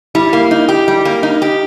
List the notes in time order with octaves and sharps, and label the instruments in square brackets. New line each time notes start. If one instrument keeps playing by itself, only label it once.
[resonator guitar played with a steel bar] G3 [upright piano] E4
[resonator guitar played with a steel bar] A#3
D#4
G4
G3
A#3
D#4
G4